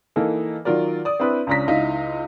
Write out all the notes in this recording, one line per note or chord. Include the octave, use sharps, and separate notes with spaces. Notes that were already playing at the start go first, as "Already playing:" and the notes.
E3 A#3 D#4 A4
D#3 F#3 F4 A#4 D5
D5 D#6
C4 D4 E4 B4
C#2 C#4 D4 A#5 A#6 B6
C#2 D#4 E4 F5